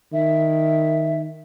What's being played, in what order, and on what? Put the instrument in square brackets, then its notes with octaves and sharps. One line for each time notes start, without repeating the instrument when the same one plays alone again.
[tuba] D#3 [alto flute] E5